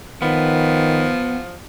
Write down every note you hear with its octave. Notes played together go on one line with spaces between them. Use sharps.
D#3 F3 B3